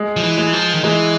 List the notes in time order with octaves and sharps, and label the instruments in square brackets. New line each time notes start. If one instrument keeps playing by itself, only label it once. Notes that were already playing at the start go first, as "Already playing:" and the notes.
Already playing: [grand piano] G#3
[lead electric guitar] F3
E3
[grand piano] G#3
[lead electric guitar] F3
D#3
[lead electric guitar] E3 [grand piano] G#3